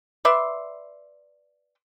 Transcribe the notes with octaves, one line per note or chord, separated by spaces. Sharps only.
B4 D5 E5 C6